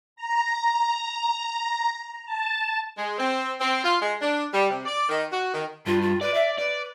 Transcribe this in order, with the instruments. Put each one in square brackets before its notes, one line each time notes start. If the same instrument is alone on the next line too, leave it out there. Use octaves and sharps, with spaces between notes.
[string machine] A#5
A5
[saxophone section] G#3
C4
C4
F4
G#3
D4
G3
C3
D5
D#3
F#4
D#3
[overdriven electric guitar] G2 [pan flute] F4
[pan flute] F4
[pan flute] B4 [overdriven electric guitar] D5
[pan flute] E5
[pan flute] B4 [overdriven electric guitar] D5